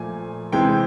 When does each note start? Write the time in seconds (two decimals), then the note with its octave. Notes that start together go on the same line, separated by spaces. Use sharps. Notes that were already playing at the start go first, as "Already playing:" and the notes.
Already playing: A#2 F3 A3 G#5
0.52 C3 E3 G#3 G5